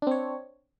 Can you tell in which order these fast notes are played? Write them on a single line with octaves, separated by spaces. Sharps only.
D4 C4 C#5